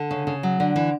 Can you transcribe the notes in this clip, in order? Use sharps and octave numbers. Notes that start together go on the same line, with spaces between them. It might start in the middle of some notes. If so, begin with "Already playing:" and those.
Already playing: D3
C#3
C#3
F#3
D3
E3